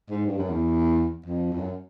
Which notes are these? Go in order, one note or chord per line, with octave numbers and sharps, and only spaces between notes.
G#2
G2
F#2
E2
F2
F2
F#2